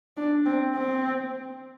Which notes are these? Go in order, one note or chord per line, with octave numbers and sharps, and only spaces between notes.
D4
C4
C4